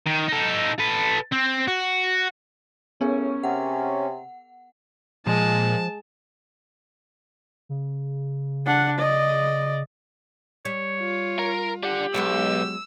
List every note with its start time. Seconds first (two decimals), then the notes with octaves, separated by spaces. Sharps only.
0.07 D#3
0.28 D#4 A4
0.80 A4 B4
1.33 C4
1.68 F#4
3.01 A2 B3 C#4 G#4 A#4
3.43 C3 F#5
5.26 A#2 F3 G#3 A5
7.69 C#3
8.66 D4 F#5
8.99 D5 D#5
10.65 G3 C#5
11.00 F4
11.39 A#4
11.83 D4 G4 F#5
12.14 B1 F#3 G#3 B3 E6